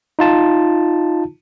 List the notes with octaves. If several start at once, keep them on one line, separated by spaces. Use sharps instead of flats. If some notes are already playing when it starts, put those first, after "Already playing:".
D#4 F4 A5